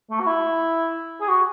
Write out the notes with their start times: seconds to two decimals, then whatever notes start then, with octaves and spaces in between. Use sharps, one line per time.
0.10 A3
0.20 F#4
0.27 E4
1.21 G#4
1.28 F#4